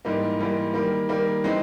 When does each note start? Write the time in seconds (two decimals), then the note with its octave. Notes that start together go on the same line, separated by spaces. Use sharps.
0.05 G#2 E3 G3 A#3 D#4
0.39 G#2 E3 G3 A#3 D#4
0.74 D#3 G3 A#3
1.09 D#3 G3 A#3
1.44 E3 G#3 C4 D#4